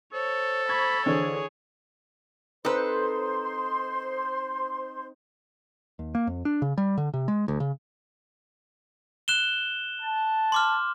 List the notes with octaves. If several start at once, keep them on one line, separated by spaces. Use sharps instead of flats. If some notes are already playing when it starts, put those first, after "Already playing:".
A4 C5 C#5
B5 C#6 G#6
D3 E3 D4 G#4 C5 C#5
C4 D#4 A4 B4 C5 C6
D#2
A#3
F2
D4
C#3
G3
D3
C3
G#3
D2
C#3
F#6 E7 G7
A5
C6 D6 F6